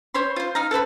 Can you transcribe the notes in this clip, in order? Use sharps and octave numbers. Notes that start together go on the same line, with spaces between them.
C5 C#5 B5 C6
F4 C5
D#4 F5 A#5
A4 B4 C5 B5